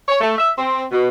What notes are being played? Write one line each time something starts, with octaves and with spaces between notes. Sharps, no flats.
C#5
A3
E5
C4
B2